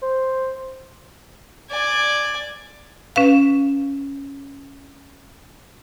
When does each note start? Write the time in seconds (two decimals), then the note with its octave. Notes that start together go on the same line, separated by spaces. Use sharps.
0.02 C5
1.71 D5 G#5
3.16 C#4 B4 F5